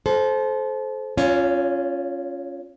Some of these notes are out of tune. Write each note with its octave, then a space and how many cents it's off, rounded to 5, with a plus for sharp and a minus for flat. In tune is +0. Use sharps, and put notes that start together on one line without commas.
A4 -30 C5 +0
C#4 +0 F4 +0 C#5 +45